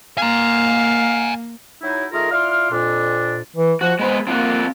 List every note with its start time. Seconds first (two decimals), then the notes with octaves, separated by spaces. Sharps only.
0.18 A#3 F5 G#5 A#5
1.82 F#3 D#4 E4
2.12 D#3 A3 F4 G#4 A#4
2.31 E4 F4 D5 C6 F6
2.71 F2 A#2 D4
3.56 E3
3.81 F3 F#4
3.99 G#3 B3 B4 C5
4.27 A#3 C4 F4 F#4